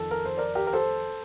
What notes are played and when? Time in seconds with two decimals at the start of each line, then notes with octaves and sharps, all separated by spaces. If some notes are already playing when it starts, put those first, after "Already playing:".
Already playing: F2 D#3 A4
0.11 A#4
0.25 C5
0.37 A#4 D5
0.55 G4 A#4
0.67 A#4
0.73 A4 C5